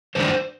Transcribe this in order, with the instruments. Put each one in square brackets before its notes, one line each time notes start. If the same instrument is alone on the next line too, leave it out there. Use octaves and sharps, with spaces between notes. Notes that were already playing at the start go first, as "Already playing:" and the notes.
[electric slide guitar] G2 D#3 D4 C5